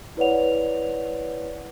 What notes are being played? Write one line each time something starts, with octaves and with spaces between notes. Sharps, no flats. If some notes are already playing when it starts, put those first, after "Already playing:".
E4 B4 C#5 D5 F#5 F7